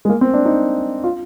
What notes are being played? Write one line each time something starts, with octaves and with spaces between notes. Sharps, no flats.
G#3
A#3
C4
D4
D#4
F4